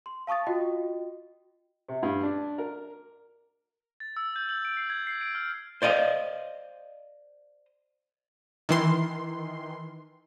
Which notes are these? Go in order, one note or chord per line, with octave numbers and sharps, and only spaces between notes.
C6
F5 A5 C#6 D#6 A6
F4 F#4 D#5 G5
C3
G2
D4
A#4
A6
E6
G6
F#7
D7
C7
G#6
C7
D7
F6
C5 D5 D#5 F5
D#3 E3 C6